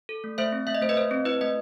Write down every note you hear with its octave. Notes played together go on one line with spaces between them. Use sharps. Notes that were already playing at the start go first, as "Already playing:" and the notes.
A4
A3
A3 C5 E5
C4
A3 E5
D#5
A3 C5
B4 D#5
A3 C5
C4
E4 B4 D#5
A3 B4 D#5